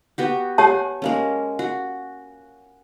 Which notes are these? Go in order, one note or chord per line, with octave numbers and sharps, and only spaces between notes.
B3 F#4 G4
G4 C#5 F#5 G#5 A5
G#3 A#3 C#4
F#4